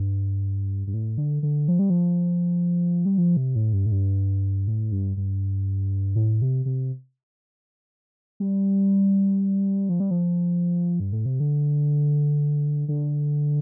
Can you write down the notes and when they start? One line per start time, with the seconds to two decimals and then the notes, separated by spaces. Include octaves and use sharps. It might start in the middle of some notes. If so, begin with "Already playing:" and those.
Already playing: G2
0.87 G2
0.94 A2
1.18 D3
1.43 D3
1.68 F3
1.79 G3
1.90 F3
3.05 G3
3.18 F3
3.37 C3
3.55 A2
3.73 G2
3.86 A2
3.92 G2
4.67 A2
4.92 G2
5.17 G2
6.16 A2
6.42 C3
6.65 C3
8.40 G3
9.89 F3
10.00 G3
10.11 F3
11.00 G2
11.13 A2
11.26 C3
11.40 D3
12.88 D3